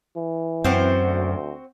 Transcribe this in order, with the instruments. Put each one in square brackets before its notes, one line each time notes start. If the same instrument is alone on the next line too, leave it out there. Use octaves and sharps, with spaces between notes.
[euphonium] E3
[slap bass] F#2 [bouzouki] C4 F#4 C5
[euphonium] D2